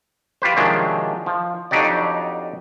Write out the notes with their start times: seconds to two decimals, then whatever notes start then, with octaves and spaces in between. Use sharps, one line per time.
0.42 F4 G4 B4 C5
0.56 C3 D#3 F3 F#3 G#3 D4
1.26 F3
1.71 F2 F#3 D4 D#4 G4 D5